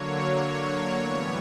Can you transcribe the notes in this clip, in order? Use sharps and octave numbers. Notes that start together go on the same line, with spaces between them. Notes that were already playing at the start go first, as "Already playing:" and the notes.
Already playing: D3 F#3 A#3 C#5
C#5
A2 E3 G3 B3